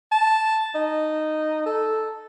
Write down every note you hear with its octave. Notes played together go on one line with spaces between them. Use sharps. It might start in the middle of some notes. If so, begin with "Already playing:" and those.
A5
D#4
A4